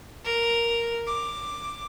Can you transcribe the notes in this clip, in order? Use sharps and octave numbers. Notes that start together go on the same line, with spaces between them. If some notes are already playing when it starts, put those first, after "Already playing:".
A#4
D6